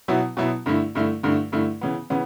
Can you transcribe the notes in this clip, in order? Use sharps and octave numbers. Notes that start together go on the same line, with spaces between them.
B2 F#3 B3 E4
B2 F#3 B3 E4
G2 D3 A3 E4
G2 D3 A3 E4
G2 D3 A3 E4
G2 D3 A3 E4
C#3 E3 B3
C#3 E3 B3